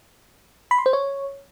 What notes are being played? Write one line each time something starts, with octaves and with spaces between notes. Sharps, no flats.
B5
C6
C5
C#5